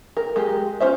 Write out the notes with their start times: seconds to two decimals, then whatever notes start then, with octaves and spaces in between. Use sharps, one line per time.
0.17 A#4
0.36 G#3 G4
0.80 C#4 F4 C5 E5